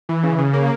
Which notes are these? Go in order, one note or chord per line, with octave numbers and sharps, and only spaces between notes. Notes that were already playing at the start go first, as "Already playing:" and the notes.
E3
C#3
C#3
A#3